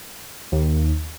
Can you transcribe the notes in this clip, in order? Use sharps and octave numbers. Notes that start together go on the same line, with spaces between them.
D#2